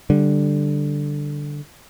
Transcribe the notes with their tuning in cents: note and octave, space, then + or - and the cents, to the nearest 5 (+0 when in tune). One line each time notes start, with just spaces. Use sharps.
D3 +0 G3 +0